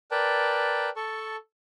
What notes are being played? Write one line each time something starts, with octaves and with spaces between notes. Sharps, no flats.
A#4 B4 D5 G5 A5
A4 A5 C#6